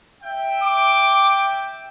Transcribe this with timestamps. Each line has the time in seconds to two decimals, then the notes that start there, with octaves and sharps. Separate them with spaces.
0.22 E5 G5
0.64 D6